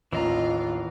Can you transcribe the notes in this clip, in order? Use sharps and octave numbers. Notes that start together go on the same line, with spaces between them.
A1 D#2 E3 F4 D#5 A#5